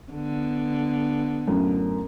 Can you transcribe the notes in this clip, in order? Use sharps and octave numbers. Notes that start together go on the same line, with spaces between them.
D3 B3
F#2 A2